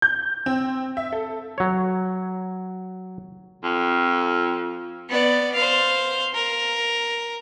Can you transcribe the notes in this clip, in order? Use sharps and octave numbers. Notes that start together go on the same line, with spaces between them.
G6
C4
E5
A4
F#3 C#5
F2
B3 D5
C5 F5
A#4